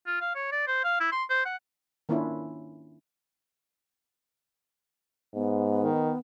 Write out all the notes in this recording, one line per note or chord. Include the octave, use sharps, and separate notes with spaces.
F4
F5
C#5
D5
C5
F5
E4
C6
C5
F#5
D#3 A#3 C#4 D4 E4 F4
G#2 B3
D#3